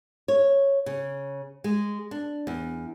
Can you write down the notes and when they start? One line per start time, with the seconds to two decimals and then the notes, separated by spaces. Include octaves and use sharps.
0.28 C#5
0.86 C#3
1.64 G#3
2.11 D4
2.47 E2